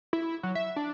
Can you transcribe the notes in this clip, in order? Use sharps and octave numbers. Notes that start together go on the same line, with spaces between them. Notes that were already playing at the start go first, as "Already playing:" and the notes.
E4
F#3
E5
D4